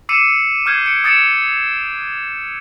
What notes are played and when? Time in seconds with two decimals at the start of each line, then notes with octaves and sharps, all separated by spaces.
0.09 D6 E6 C7 C#7 D#7 E7
0.66 D6 F6 G6 G#6 C7
0.86 C#7 D7
1.04 D#6 A6 C#7 D7 E7